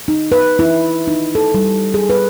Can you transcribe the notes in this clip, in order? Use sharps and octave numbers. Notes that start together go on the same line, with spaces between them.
D#4
B4
E4
D#4
A4
G3
G#4
B4